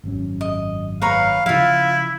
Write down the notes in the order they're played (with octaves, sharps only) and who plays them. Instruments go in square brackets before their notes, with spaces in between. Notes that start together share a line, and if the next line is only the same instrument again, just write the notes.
[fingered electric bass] G#1 F#2 C#4
[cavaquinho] D#5
[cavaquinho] B4 C#5 A#5 [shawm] F5
[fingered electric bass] C#3 F3 [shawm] E4 [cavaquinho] F4 F5